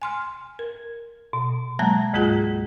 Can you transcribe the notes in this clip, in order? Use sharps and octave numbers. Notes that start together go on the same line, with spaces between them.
G#5 C6 F6
A#4
B2
F#3 G#3 A#3 A5 A#5
D2 G#2 G#3 F4 G#4 F#6